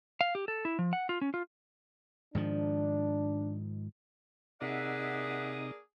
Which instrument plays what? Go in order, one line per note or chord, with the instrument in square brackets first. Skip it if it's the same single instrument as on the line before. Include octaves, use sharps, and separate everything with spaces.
[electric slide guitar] F5
G4
A4
E4
F3
F#5
F4
C#4
F4
[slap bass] G#2 D#3 F3 [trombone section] D4
[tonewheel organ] C3 D#4 D#6 [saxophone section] A#3 D4 G#4 [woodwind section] E5 F#5